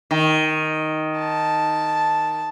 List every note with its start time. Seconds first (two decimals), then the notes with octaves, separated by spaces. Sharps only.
0.11 D#3
1.19 A5